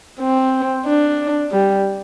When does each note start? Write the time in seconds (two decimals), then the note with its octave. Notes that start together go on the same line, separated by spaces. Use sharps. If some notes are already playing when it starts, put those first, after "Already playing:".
0.20 C4
0.86 D4
1.51 G3